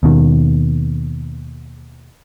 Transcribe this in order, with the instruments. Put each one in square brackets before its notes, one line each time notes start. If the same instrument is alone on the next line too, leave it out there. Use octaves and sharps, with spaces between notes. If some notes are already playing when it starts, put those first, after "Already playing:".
[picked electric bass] D#2 B2 D#3